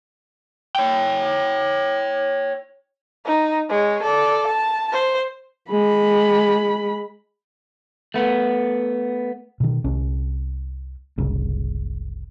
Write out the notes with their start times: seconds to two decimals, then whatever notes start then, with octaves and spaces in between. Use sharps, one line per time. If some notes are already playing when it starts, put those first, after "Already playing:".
0.76 C#5 G5
3.26 D#4
3.70 G#3 C#5
4.03 A4 D5
4.47 A5
4.92 C5
5.71 G#3 B5
8.14 A3 B3
9.60 B2 D#3
9.84 C2 C#4
11.18 F#1 C2 C#3